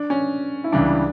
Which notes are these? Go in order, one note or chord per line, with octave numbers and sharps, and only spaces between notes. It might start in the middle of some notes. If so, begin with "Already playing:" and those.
Already playing: D4
C#4
E4
C#2 C#3 E3 G3 D4